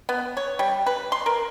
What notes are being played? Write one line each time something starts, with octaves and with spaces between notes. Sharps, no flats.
B3
C#5
G3
B4
C6
A#4